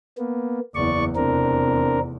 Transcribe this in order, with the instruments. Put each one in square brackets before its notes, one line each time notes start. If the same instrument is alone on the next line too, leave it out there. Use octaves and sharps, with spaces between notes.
[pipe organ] A#3 B3
[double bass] F#1 E2 [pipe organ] D5 C#6
[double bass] F1 E2 [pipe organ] C4 D4 A#4